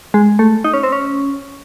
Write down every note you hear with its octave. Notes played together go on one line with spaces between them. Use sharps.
G#3
A3
D#4
C#4
C4
C#4